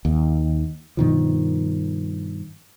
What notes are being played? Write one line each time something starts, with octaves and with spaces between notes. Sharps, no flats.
D#2
G2 B2 D#3 F3